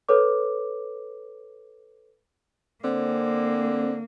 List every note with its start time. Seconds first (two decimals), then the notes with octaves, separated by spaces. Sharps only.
0.09 A4 B4 C#5 D6
2.84 D3 A#3 C4